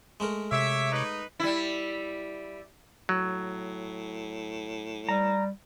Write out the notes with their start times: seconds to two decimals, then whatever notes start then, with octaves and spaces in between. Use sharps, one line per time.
0.20 G#3 A3 A#4
0.52 C3 C#5 E5 D6
0.92 D#4 B4
1.40 G3 E4
3.09 A2 F#3
5.09 G3 A#5